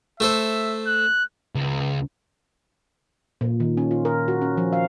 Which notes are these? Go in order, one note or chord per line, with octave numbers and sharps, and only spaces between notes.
A3 A4 C5 E5
F#6
C#2
A#2
D#3
C#4
F4
A#4
F#4
C#4
F3
F5